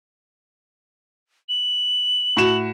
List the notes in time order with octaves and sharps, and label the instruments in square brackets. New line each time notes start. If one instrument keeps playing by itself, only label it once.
[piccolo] F#7
[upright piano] A2 F#4 E7